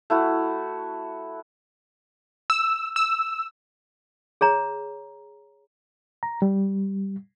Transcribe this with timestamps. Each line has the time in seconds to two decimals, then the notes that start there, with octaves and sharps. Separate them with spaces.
0.10 A3 E4 F#4
2.50 E6
2.96 E6
4.41 G#4 C#5 A#5
6.23 A#5
6.42 G3